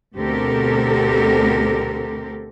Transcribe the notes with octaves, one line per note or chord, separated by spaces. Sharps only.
D2 B2 C4 G4 A4 A#4